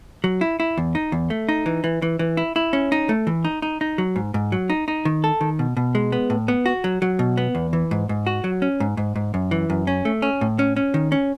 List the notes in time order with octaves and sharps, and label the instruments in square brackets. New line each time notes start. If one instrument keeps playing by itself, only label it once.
[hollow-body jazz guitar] F#3
E4
E4
E2
D#4
E2
A3
D#4
E3
E3
E3
E3
E4
E4
C#4
D#4
A3
E3
D#4
D#4
D#4
F#3
G#2
G#2
F#3
D#4
D#4
D#3
A4
D#3
B2
B2
G#3
B3
A2
B3
F#4
F#3
F#3
B2
B3
E2
E3
G#2
G#2
F#4
F#3
C#4
G#2
G#2
G#2
F#2
E3
F#2
C#4
A3
C#4
A2
C#4
C#4
D#3
C#4